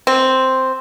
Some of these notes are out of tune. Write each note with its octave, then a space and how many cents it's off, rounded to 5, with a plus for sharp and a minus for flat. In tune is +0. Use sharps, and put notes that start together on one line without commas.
C4 +0